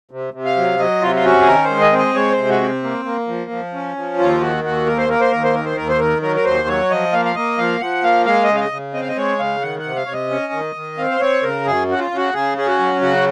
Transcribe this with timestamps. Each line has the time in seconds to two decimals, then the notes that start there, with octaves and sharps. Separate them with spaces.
0.11 C3
0.34 C3
0.45 F5
0.57 F#3
0.79 F#3 D#5
1.02 C3 F4
1.15 F4
1.25 C#4 F#4
1.41 G#4
1.47 D#3 A#4
1.64 C5
1.70 G#3
1.81 D#5
1.92 C4
1.98 D#5
2.15 G#3 C#5
2.32 C5
2.38 C3
2.49 F#4
2.61 C4
2.83 A#3
3.05 A#3
3.28 F3
3.51 F3
3.73 C#4
3.97 F3
4.18 D#2 F4
4.41 D#3 F#4
4.64 D#2 F#4
4.86 A#3 A#4
4.98 C5
5.09 A#3 A#4
5.21 C5
5.32 D#2 A#4
5.44 C5
5.54 D#3 A#4
5.65 C5
5.77 D#2 A#4
5.89 C5
5.99 D#3 A#4
6.22 F#3 A#4
6.36 A#4
6.45 D#2 C5
6.68 F#3 C#5
6.90 F3 D#5
7.12 A#3 F5
7.25 F5
7.36 A#3 D#5
7.58 F3 F5
7.81 F3 F#5
8.04 A#3 F5
8.26 G#3 F5
8.44 D#5
8.49 C#3
8.55 F5
8.60 D#5
8.72 C#3
8.94 C4 D#5
9.01 F5
9.08 D#5
9.17 G#3 C#5
9.39 C#3 F5
9.61 D#3 F#5
9.79 F#5
9.85 C3
9.96 F5
10.06 C3 C#5
10.13 D#5
10.30 C#4
10.53 D#3
10.76 D#3
10.98 C4 F5
11.12 C5
11.21 C4 C#5
11.43 C#3 A#4
11.66 F#2 G#4
11.88 C#3 F#4
11.99 F4
12.11 C#3
12.16 F#4
12.34 C#3 G#4
12.56 C#4 G#4
12.67 F#4
12.79 F#3
13.01 C#3 F#4